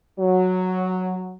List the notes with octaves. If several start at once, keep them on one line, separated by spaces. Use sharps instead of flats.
F#3